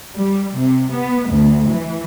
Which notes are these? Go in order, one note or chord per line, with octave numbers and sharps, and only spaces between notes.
G3
C3
B3
D2
E3